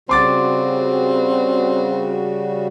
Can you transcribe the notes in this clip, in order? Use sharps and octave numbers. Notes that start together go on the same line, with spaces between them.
C#3 G3 C4 F#4 C6 D6 A6